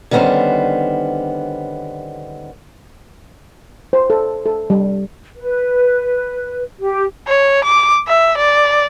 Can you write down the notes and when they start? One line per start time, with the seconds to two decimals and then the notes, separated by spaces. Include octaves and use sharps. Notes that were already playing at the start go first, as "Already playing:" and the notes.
0.11 D3 D#3 G3 B3 C#4 C5
3.93 C5
4.10 A4
4.46 A4
4.70 G3
5.37 B4
6.80 G4
7.27 C#5
7.64 D6
8.07 E5
8.38 D5